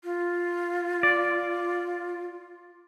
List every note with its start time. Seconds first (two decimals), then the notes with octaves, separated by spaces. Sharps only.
0.04 F4
1.03 D5